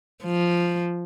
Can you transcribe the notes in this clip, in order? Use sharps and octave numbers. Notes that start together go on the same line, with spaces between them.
F3